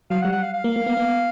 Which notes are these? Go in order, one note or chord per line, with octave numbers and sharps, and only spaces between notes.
F#3 F5
F#5
G3
F#5
F5
F5
A#3
A#3
B3
B3